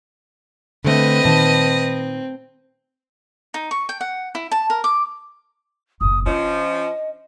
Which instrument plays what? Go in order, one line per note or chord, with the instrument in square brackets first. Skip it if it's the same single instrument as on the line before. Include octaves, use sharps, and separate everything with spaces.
[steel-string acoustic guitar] D3 A3 [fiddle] C4 [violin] B4 D#5
[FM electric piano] A#2 D#3 [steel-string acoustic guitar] A5
[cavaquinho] D#4
C#6
G5
F#5
E4
A5
A#4
D6
[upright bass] F#1 A#2 [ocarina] D#6
[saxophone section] F3 C#4 [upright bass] D4 [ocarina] D#5